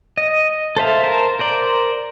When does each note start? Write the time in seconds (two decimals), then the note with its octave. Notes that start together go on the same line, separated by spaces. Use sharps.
0.17 D#5
0.76 A4 C5 E5 F5
1.04 A#4 C5 A5
1.39 A#4 C5 D5